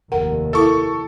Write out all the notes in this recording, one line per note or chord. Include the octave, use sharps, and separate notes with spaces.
F1 D#2 A#4 F#5
E4 A4 E5 C#6